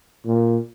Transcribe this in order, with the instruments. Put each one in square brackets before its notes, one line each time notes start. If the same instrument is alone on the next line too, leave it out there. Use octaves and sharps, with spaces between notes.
[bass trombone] A#2